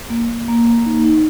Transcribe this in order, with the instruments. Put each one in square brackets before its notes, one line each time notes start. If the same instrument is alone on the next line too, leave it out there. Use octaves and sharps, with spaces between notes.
[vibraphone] A#3
A#3
A#3
A#3
D#4
D#4